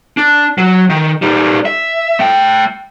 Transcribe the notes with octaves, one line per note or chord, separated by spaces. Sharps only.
D4
F#3
D#3
G3 D#4
E5
A3 G5